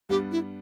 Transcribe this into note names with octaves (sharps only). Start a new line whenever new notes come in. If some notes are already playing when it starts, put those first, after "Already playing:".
G2 G3 B3 D4 G4
E4